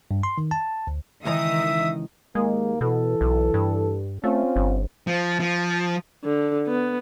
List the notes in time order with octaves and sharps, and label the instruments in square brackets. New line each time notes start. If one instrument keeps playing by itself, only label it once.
[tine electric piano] G2
C6
D#3
A5
D2
[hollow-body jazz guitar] C#2 E3 A#5 [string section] D#3 D#6 [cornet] E5
[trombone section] D#2 A#3 [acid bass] G#3
[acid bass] B2 [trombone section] E3 A4
[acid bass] B1
G2
[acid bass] A3 [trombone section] C4 C#4 F4
[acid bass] G1
[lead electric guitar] F3
F3
[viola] D3
B3